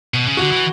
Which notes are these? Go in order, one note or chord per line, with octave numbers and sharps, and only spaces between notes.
B2
C#3
D3 F#4
E3